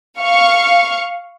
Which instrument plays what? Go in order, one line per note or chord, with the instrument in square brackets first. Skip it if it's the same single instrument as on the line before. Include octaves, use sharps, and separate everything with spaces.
[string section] F5 C#6